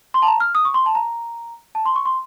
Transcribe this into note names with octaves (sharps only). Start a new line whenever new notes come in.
C6
A5
A#5
F6
D#6
C#6
C6
A5
A#5
A5
C6
C#6
C6